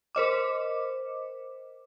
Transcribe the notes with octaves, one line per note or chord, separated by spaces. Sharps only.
A#4 C5 D#5 D6